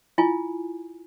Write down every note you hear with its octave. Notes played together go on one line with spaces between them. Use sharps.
E4 F4 G#5